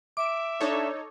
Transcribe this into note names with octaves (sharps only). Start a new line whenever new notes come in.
E5 D6 D7
D4 D#4 A4 C#5